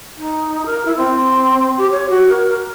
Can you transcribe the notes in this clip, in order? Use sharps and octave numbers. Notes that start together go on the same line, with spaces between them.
D#4
A#4
E4
C4
G4
C#5
F#4
A#4
A#4